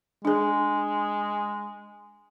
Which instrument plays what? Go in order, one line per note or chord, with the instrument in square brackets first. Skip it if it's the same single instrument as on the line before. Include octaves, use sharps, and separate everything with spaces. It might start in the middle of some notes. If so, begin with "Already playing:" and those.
[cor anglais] G#3 [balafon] D4 G#4